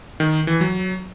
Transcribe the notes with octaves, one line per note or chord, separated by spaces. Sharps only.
D#3
E3
F#3